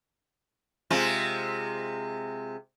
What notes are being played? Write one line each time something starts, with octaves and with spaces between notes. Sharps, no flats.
C3 G#3 F4